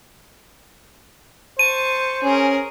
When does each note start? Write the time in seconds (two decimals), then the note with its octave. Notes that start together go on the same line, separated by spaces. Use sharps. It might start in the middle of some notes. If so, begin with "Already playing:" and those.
1.59 C5 A5 C#6 D#7
2.23 C#4 G#4 A#4